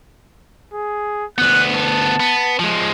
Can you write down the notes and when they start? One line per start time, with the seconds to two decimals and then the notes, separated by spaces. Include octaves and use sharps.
0.74 G#4
1.38 D2 B3 F#6
1.76 A5
2.20 B3
2.59 F3 G#3